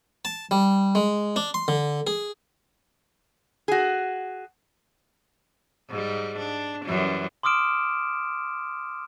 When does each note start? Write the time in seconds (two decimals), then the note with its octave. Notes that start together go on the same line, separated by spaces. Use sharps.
0.25 A5
0.51 G3
0.95 G#3
1.36 D4
1.54 C6
1.68 D3
2.07 G#4
3.68 F#4 G#4
5.89 G#2 G3
6.38 D4
6.85 F#2 E3 G3
7.43 C6 D6 D#6 F6 D7 E7